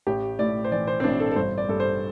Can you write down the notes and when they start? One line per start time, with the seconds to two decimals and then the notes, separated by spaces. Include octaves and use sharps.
0.07 A1 G4
0.39 A2 D5
0.64 C5
0.72 E3 D5
0.87 C5
1.00 C4
1.04 A1 D4
1.20 A4
1.31 A4
1.36 G1 C5
1.58 D5
1.69 G2 A4
1.80 C5